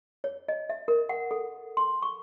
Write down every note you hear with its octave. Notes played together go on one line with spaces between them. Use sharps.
C#5
D#5
E5
A#4
F#5
A4
C6
C#6